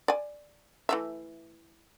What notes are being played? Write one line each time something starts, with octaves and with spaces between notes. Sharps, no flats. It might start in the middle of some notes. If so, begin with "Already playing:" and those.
D5 G#5
E3 A3 E5